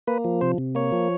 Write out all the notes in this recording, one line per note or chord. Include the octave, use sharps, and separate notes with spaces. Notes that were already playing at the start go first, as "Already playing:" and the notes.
A#3 B4
F3
C3 C5
C3
A#3 C#5
F3